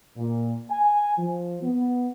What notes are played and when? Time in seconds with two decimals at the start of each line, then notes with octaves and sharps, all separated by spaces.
0.17 A#2
0.70 G#5
1.18 F3
1.62 B3